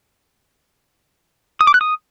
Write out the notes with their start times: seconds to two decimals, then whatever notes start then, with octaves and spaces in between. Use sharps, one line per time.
1.61 D#6
1.67 D6
1.74 F#6
1.81 D#6